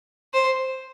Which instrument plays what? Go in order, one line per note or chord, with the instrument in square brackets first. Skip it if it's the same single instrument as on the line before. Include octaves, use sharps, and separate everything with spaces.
[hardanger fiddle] C5